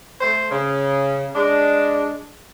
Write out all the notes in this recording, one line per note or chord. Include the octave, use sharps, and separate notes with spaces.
A3 C5
C#3
G#3 D4